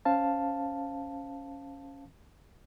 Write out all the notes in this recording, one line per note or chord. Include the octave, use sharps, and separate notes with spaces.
C#4 C5 F5 A5